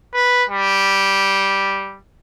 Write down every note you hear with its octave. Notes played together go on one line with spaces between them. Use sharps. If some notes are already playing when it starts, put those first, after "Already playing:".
B4
G3